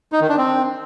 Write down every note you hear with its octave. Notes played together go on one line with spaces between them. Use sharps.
D#4
D#3
D4
C4